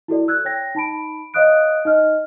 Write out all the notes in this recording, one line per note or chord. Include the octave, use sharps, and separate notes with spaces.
E4 F#4 A4 D5
E6 F#6 G#6
C#5 G5 A#6
D#4 A5 B5 D7
C#5 D#5 F5 D#6 F#6 D7
D#4 D#5 F6